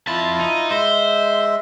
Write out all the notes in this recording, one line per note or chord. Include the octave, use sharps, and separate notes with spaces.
F2 E4 F4 A5
D#4
G#3 C5 E5